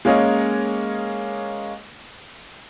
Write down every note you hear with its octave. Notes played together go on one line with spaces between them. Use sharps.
G#3 A#3 C#4 C#5 D#5